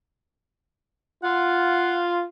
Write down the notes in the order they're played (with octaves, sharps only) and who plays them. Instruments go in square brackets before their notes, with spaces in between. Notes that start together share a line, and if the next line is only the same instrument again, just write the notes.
[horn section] F4 [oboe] F#5